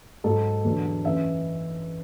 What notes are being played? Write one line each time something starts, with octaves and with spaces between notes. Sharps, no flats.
G#2 F#3 A4
E2 D3 F#3
F#2 E3 E5